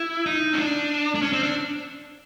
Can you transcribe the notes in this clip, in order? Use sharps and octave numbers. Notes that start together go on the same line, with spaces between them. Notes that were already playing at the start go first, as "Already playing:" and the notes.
Already playing: E4
D#4
C#4
D4
D4
C#4
C4
D4